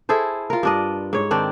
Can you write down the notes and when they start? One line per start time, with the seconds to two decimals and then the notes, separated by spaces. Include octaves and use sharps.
0.09 E4 G#4 A4 C5
0.50 F4 A#4
0.63 G2 D4 D#5
1.13 G#2 C#5
1.31 D#3 C4 D4